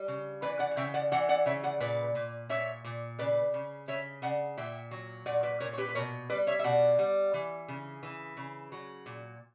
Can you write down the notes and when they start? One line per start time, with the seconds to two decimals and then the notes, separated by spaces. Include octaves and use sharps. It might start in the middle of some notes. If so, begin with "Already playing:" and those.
Already playing: G3
0.08 C#3
0.42 E3 B4 D5
0.59 D5 F#5
0.71 F#5
0.77 C#3 E5 G5
0.94 D5 F#5
1.12 E3 D5 F#5
1.29 D5 F#5
1.46 C#3 C#5 E5
1.63 D5 F#5
1.80 A#2 B4 D5
2.15 A#2
2.49 A#2 C#5 E5
2.84 A#2
3.19 C#3 B4 D5
3.54 C#3
3.88 C#3 C#5 E5
4.22 C#3 D5 F#5
4.57 A#2 E5 G5
4.91 F#3
5.26 A#2 D5 F#5
5.43 B4 D5
5.60 A#2 A#4 C#5
5.73 C#5
5.78 G4 B4
5.89 B4
5.95 B2 A#4 C#5
6.30 G3 B4 D5
6.47 C#5 E5
6.59 E5
6.64 B2 D5 F#5
6.99 G3
7.34 E3
7.68 C#3
8.03 E3
8.37 C#3
8.72 F#3
9.06 A#2